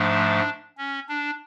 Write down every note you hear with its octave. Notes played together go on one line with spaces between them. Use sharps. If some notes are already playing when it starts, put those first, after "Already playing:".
Already playing: G#2 F3 A3 D4
C#4
D4